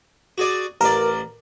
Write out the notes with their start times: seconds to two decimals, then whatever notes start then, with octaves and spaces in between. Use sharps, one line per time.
0.38 F#4 G#4 D5
0.81 A1 A#4 D5